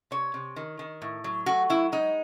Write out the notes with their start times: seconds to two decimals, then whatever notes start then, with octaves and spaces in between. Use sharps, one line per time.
0.11 C3 C#5
0.34 C3
0.56 D#3
0.79 D#3
1.02 A2
1.24 F#3
1.46 A3 F#4
1.69 F#3 E4
1.92 G#3 D#4